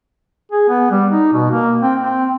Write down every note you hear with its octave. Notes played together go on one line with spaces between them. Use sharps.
G#4
B3
G3
D#4
B2
A#3
C4
C4